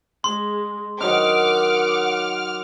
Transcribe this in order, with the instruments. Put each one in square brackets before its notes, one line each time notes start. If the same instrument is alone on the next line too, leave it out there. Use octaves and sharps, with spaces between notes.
[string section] G#3 [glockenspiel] C6
[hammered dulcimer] D#3 F#3 D#4 [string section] F#5 D6 [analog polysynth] F6